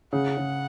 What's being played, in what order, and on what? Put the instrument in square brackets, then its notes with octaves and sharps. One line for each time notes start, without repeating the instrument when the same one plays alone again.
[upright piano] C#3 [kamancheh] F#5
[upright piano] C#3